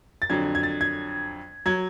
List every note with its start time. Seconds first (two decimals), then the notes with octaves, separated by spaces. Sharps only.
0.22 A6
0.30 F2 D3 F#3 G#6
0.55 G#6
0.63 A6
0.81 G#6
1.66 F#3 G#6